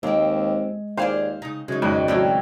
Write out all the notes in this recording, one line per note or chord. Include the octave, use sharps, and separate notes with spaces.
D#2 G#3 C4 A#4
D#2 F4 G#4 C5 D5 F5
C#3 D#4
F#2 C#3 G#3 D#4 C#5 C#6
G#1 F2 G#2 G3
A2 F#3 C4 F4 D5